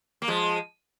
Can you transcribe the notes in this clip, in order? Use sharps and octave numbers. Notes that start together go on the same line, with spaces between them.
A#3
F3 G#3